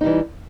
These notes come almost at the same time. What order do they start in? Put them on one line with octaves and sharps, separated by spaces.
D#4 G3 E3